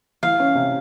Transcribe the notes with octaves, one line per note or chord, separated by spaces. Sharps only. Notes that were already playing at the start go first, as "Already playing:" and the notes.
E3 F5
C#4
C3